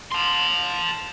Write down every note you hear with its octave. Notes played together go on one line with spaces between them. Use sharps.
A5 C6